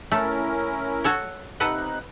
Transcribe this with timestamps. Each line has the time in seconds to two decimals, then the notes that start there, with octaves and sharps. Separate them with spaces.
0.12 A3 C#4 E4 A#4
1.04 F#4 A4 C#5
1.60 C3 D#4 A4 B4 F#5 F#6